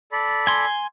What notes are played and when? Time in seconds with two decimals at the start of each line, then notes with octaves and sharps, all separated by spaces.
0.12 A4 D5 B5
0.47 G#5 C6